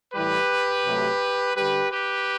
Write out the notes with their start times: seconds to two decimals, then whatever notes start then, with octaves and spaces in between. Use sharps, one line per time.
0.13 A2 E3 G3 G4 B4
0.85 C3 F#3 A3
1.56 D3 G3 G4 B4
1.92 G4 B4